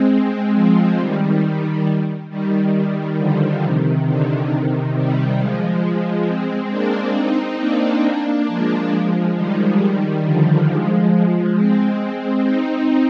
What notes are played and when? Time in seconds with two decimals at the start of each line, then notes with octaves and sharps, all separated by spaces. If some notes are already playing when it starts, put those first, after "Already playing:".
Already playing: G#3 C4
0.54 F3 G#3
0.97 D#3 G3
2.30 D#3 G3
3.18 D3 F3
3.63 C3 D#3
4.07 D3
4.50 C3 D#3
4.95 D#3 G3
5.39 F3 G#3
6.27 G#3 C4
6.71 A#3 D4
7.15 C4 D#4
7.59 A#3 D4
8.48 F3 G#3
9.36 D#3 G3
10.24 D3 F3
10.68 F3 G#3
11.57 G#3 C4
12.45 C4 D#4